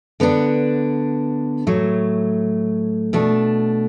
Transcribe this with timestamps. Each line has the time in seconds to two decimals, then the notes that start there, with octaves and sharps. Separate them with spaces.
0.20 D3 B3 D4
1.67 A2 F#3 A3
3.13 B2 A3 D4